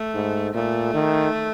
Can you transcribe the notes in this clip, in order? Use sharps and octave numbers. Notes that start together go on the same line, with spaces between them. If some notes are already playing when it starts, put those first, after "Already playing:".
Already playing: A3
G#2
A#2 A3
D#3